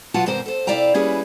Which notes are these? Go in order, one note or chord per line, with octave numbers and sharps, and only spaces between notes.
B2 F#3 F4 F#4 F#5 A5
E2 G#2 C3 A#4 C5
A4 C5
C3 E4 D5 F5 G5 A#5
G3 A#3 C#4 E4 G#4 B4